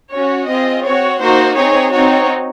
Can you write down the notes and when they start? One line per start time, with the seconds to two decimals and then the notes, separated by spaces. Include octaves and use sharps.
0.12 C#4 F#4 C#5
0.47 C4 F4 G#4 D#5
0.83 C4 F#4 C#5
1.19 A#3 D#4 F#4 C5
1.55 C4 D#4 G#4 C#5
1.92 C4 D#4 F#4 C#5